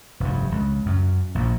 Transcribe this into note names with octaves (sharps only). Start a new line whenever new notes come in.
F1 G2
C#2
F#2
A#1 A#2